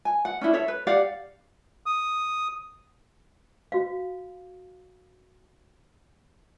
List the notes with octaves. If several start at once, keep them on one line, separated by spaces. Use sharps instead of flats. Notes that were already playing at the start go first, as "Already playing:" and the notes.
G#5
F#5
C#4 D4 E4
A4 C#5 E5
B4
G4 D5 F5 F#5
D#6
F#4 F5